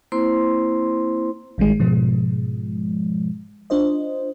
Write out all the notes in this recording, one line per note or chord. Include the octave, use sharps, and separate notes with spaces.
A#3 C4 E4 C5 C6
A1 D#3 G3 G#3
G#2 B2 F3 G#3
D4 F4 C5 D#5